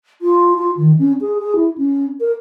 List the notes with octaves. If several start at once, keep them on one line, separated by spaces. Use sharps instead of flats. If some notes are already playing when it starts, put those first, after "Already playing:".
F4
F4
D#3
C#4
G#4
G#4
E4
C#4
A#4